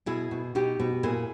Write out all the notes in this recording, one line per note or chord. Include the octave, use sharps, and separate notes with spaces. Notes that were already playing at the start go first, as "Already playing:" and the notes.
B2 E4 G#4
B2
B2 D#4 G4
B2
A#2 E4 G#4